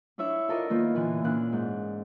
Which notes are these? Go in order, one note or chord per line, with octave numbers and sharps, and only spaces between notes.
D4 E4 C#5 E5
F4 A4 A#4 D5 D#5
D#3 A#3 B3 F4
A#2 D3 E3
A#2 C#4 D4 F#6
G#2